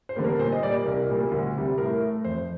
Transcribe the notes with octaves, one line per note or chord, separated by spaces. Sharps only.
C5
D3 G3 A#3
A#4
A#2 C5
D#5
G3 A#3 D5
C2 A#4
A#2 G3 A#3
D2
C3 G3
A2 A#4
A3
F2 C5